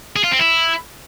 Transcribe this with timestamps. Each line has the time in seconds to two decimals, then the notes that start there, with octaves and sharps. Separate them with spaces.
0.16 G#4
0.24 F4
0.32 C4
0.39 E4